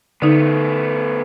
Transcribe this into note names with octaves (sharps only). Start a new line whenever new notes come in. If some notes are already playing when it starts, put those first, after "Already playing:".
D3 A3 B3 D#4